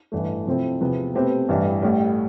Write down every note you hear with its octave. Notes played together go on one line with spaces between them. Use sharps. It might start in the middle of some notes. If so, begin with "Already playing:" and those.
A1 G2 E3 A3
C3 F3 A3 C4 E4
E2 C3 F3 B3
B2 A3 C4 G4 B4
A1 G2 E3 G3
A1 A2 G3